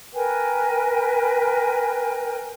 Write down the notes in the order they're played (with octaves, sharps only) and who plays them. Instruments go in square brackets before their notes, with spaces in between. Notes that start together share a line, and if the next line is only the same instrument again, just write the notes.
[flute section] A#4 B4 G5 G#5